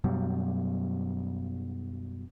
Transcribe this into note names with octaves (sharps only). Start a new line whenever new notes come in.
F#2 B2 F#3 G3